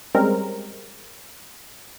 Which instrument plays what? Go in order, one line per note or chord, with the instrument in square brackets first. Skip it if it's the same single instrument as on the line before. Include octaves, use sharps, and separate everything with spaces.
[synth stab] G3 G#3 C4 C#4 A#4